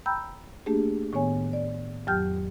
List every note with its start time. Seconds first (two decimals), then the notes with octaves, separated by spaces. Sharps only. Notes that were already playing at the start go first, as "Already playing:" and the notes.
0.06 G5 A#5 B5 E6 G6
0.66 A3 A#3 D4 G4 G#4
1.13 A2 D#3 B3 C#5 G#5
1.53 D5
2.07 F2 F#3 G4 G5 F6 G6